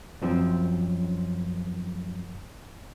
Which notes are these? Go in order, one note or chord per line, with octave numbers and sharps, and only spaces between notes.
F#2 F3 C4